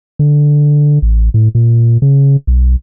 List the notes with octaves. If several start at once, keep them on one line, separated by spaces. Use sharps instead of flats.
D3
A1
A2
A#2
C#3
B1